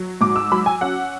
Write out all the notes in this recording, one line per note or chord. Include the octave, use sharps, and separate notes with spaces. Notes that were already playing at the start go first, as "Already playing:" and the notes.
Already playing: F#3
G#2 D6
E6
F#3 B5
G#5
C#4 F#5